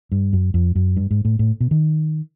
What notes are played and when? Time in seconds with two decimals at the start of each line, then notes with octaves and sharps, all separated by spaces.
0.12 G2
0.33 F#2
0.54 F2
0.75 F#2
0.97 G2
1.11 G#2
1.25 A2
1.39 A2
1.60 B2
1.71 D#3